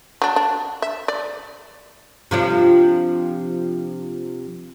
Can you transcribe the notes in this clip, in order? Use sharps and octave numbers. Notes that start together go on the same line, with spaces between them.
F#3 D4
D4
E5
D5
C3 F3 D4